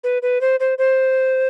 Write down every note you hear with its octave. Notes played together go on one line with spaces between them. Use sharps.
B4
B4
C5
C5
C5